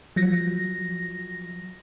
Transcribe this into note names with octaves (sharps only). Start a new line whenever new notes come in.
F3 F#3 A#6